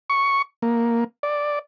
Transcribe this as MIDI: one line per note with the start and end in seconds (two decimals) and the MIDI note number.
0.10 0.42 85
0.62 1.04 58
1.23 1.59 74